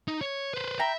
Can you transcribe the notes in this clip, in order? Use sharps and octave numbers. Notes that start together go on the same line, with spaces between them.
D#4
C#5
B4 C5
E5 G5 A#5 B5